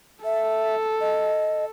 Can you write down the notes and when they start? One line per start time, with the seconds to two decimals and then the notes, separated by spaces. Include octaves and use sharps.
0.25 A4 E5
1.01 D#5